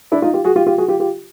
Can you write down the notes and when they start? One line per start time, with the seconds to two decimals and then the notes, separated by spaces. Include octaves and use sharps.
0.12 D4 E4
0.22 D#4 F4
0.34 F4 G4
0.44 F#4 G#4
0.56 F4 G4
0.67 F4 G4
0.78 F#4 G#4
0.88 F4 G4
1.00 F4 G4